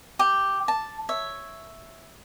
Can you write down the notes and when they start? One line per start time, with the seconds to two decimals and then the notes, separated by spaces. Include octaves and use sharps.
0.19 G4
0.68 A5
1.09 C#5 E5